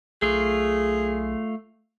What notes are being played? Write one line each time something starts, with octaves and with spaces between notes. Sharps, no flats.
B1 A3 F4 G#4